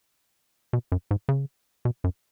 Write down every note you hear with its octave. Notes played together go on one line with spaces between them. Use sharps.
B2
F#2
G#2
C#3
B2
F#2